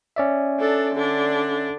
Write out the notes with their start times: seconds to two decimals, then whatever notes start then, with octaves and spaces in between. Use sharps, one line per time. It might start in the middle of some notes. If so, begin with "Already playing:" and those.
0.16 C#4 D5 E5
0.60 D4 A4
0.95 D3 D4